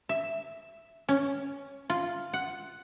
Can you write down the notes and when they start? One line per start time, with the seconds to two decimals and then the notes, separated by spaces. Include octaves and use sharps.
0.09 E5
1.09 C#4
1.90 F4
2.33 F#5